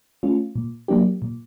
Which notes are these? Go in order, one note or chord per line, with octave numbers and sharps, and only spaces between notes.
A3 C#4 F4
A#2
F#3 A#3 D4 G4
A#2